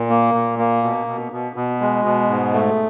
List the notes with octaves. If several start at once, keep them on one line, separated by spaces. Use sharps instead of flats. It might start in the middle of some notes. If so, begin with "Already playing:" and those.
Already playing: A#2
A#3
A#2
A#3
B2
B2
B2
B2
G#3
B2
G#2
A3